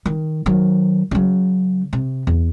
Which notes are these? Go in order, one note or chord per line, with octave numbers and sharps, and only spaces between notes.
D#3
D#3 F#3
C#3 F#3
C3
E2